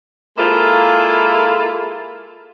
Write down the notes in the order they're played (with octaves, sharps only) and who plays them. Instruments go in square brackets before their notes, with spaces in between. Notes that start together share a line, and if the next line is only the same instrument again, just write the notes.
[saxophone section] G#3 A#3 E4 F4 A4